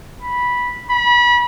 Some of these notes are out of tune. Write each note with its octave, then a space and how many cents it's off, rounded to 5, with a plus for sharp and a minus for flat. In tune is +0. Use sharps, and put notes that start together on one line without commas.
B5 -10
B5 -30